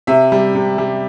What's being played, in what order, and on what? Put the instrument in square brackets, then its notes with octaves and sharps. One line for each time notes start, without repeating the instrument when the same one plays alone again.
[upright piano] C3 E5
G3
C3
G3